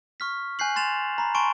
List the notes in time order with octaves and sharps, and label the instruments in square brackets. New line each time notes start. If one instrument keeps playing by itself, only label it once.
[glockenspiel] C#6 F6 B6
G#5 F#6 G6 C7 F#7
C6 A6 E7 F7
A#5 B5
G#5 A5 C6 C#6 D7